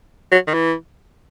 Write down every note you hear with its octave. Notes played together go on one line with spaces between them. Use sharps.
F#3
D#3
E3